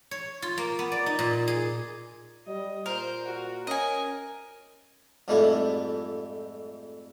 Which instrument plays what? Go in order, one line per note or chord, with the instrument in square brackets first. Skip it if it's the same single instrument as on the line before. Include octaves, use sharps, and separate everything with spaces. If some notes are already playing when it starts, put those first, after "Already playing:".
[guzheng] C#5
F4
A#3
B3
D5
D#4
A#2
G#4
[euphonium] G3 [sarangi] D#5
[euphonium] A#2 [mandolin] A#4 [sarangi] C5
[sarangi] F#4
[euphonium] C#4 [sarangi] A#4 [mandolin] D#5 G#5
[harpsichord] F2 G#2 G3 A3 E4 F4